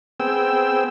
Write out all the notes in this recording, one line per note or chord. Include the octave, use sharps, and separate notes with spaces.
B3 C4 G#4 G5 E6